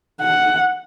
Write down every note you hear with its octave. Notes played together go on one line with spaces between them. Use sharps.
F#5